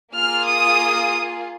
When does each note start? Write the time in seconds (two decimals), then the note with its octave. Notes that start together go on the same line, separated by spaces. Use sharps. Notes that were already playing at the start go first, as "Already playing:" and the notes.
0.15 A#3 F4 G#4 F6
0.47 D#6